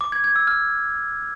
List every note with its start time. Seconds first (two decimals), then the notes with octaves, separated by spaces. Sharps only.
0.01 D6
0.12 G#6
0.24 G#6
0.36 E6
0.47 F6